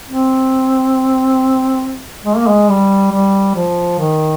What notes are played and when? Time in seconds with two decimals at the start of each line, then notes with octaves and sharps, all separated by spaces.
0.09 C4
2.25 G#3
2.37 A#3
2.47 G#3
2.69 G3
3.12 G3
3.56 F3
3.98 D#3